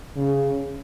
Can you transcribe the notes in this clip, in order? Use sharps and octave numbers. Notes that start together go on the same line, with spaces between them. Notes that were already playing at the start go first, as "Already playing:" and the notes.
C#3